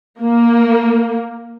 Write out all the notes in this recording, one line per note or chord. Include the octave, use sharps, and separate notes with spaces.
A#3